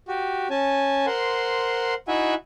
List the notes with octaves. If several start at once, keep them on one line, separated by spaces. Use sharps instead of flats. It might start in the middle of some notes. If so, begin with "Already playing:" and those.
F#4 G4
C#4 G#5 A5
A#4 C5 F#5 C6
D#4 E4 F#4 E5 F#5 G#5